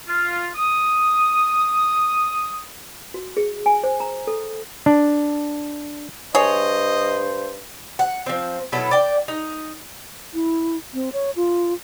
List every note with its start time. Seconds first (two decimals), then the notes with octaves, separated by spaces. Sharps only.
0.07 F4
0.54 D#6
3.14 F#4
3.37 G#4
3.66 G#5
3.84 C5
4.00 A#5
4.27 A4
4.86 D4
6.35 G2 G#4 C5 C#5 D#5
7.99 F#5
8.26 F3 C4
8.72 B2 F#3 E4 A4
8.91 D5 G5
9.28 D#4
10.34 E4
10.94 C4
11.13 C#5
11.36 F4